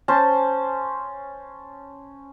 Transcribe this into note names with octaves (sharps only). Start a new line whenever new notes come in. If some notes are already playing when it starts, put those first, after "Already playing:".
C#4 C5 A5